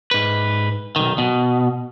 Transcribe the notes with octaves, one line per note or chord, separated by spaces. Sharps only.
G#2 B4
B1 D#3
B2